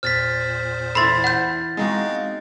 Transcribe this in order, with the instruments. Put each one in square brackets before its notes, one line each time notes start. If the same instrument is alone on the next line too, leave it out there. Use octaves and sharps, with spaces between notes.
[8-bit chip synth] E2 A#2 C5 [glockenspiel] F6 A6 B6
[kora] E3 E4 A4 [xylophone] B5 C6 [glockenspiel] A6 C7
[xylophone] F#5 G6
[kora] G#3 D#4 F#4 [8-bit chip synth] B3 C4 F5